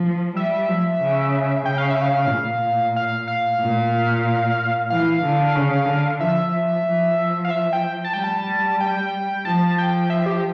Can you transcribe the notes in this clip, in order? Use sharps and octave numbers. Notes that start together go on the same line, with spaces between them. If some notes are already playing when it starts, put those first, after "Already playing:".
Already playing: F3
G3 E5
F3
C#3
C#3 G5
F5
E5
F5
A#2
F5
F5
A#2
E3 F5
D3
C#3
D3
F3 E5
F3
F5
E5
G5
A5
G3 G5
A5
G5
F3 A5
G5
E5
G4